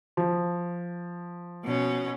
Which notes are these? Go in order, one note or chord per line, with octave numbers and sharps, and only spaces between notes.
F3
B2 C#4